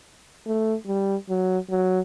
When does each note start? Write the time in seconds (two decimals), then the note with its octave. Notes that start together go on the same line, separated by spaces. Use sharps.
0.46 A3
0.87 G3
1.29 F#3
1.70 F#3